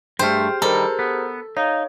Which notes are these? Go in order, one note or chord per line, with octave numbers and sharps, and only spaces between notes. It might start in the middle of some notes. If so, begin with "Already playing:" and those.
G2 A3 G4 G#4 C5 G5 F6
D#3 G3 A4 A#4 C5 A#5
B3
D#4 C#5 F5